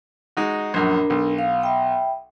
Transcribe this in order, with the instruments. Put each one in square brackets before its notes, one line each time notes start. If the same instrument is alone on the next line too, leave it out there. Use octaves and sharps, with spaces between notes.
[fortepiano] G#3 D#4 F#4
[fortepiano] A#1 F#2 [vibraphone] D4 A#4
[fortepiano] B1
[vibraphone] F5
E5 G5 B5